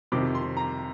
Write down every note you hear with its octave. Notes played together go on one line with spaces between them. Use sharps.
F2 C3 D#3 D6
C6
A#5